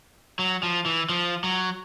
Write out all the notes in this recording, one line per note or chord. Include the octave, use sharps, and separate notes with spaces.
F#3
F3
E3
F3
F#3